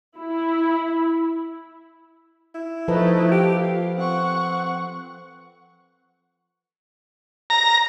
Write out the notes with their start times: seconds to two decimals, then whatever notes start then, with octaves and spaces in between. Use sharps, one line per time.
0.17 E4
2.54 E4
2.88 F3 A3 D#4 A4 B4
3.32 G4 F5
3.63 F4
3.97 C4 F#5 C#6
7.50 A#5